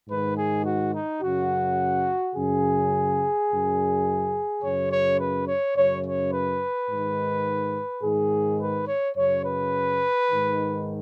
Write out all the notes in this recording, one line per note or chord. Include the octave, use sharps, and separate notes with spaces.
G#2 D#3 B4
G#4
F#4
D#4
F#2 C#3 F#4
F#2 C#3 G#4
F#2 C#3
F#2 C#3 C#5
C#5
B4
C#5
F#2 C#3 C#5
C#5
B4
G#2 D#3
G#2 D#3 G#4
B4
C#5
F#2 C#3 C#5
B4
G#2 D#3